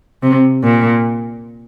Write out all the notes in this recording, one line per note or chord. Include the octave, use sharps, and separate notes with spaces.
C3
A#2